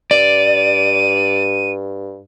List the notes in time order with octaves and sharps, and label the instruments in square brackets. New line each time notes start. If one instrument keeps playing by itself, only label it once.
[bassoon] G2 [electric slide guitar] D5 [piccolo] D#7